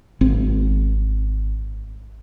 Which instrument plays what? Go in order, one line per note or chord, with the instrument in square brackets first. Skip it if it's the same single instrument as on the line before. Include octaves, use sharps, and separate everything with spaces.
[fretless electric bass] G#1 C4